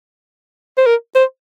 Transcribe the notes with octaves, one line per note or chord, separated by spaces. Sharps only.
C5
A#4
C5